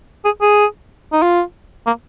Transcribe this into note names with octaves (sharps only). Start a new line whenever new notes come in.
G#4
G#4
D#4
F4
A#3